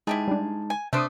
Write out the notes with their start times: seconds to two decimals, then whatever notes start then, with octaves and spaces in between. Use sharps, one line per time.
0.07 G#3 D#4 E4 G4 G#4 A5
0.28 G3 D4
0.70 G#5
0.93 C3 A3 D4 C5 D6 D#6